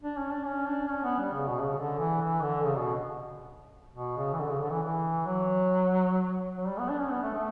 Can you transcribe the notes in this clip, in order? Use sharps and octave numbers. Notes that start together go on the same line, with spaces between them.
D4
C#4
D4
C#4
D4
C#4
B3
G3
C#3
B2
C#3
D3
E3
E3
D3
C#3
B2
B2
C#3
E3
D3
C#3
D3
E3
E3
F#3
F#3
G3
B3
D4
C#4
B3
A3
A3